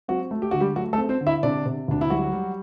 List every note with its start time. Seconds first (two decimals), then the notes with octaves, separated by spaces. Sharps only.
0.08 F#3 C4 F#4
0.31 A3
0.42 G4
0.51 D3 F#4
0.60 G3 G4
0.76 F#3 A3 F#4
0.93 A3 A4
0.98 C4
1.09 C4 C5
1.21 D3
1.27 E4 E5
1.43 C3 D4 D5
1.66 C3
1.88 D2 D4
2.01 E4
2.10 F#3 G3 F#4
2.33 G3